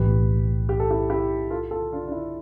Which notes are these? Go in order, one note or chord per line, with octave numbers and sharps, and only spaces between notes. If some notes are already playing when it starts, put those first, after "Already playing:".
Already playing: B1 A2 E3 G4 B4
G4
A4
E4 G4
E4 G4
F4 A4
F4 A4
D4 F4
D4
E4